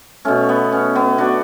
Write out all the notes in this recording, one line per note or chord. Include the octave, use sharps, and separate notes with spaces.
B2 A3 C#4
B3
C#4
B3
D4 F#4